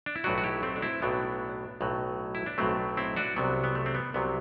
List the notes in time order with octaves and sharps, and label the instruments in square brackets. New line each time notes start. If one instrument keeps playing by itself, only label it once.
[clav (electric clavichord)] D4
E4
B1 A2 F#3 D4 F#4
F#4
E4 G4
A3 C4
D4
C4 E4
B1 A2 F#3 B3 D4
B1 A2 F#3
E4
D4
B1 A2 F#3 A3 C4
C4 E4
D4 F#4
C2 C3 F#3 B3
B3
A3
C4
B3
C2 C3 F#3 B3